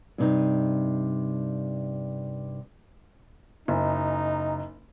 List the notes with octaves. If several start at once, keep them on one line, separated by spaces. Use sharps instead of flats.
G2 C3 D#4
F#1 D#4 D#5 G#5 A#5